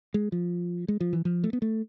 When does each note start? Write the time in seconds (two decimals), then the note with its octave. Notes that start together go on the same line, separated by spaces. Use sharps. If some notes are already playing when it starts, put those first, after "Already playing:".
0.14 G#3
0.32 F3
0.88 G#3
1.01 F3
1.13 E3
1.25 F3
1.44 A3
1.53 B3
1.62 A3